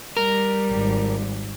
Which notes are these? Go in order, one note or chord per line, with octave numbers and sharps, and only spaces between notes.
G3 A#4
G#1